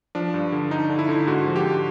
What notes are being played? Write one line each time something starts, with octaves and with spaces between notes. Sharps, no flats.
F3 D4
G2
D3
D3 D#4
D3
E4
D3
G#2 F#4
F3
G4
G#2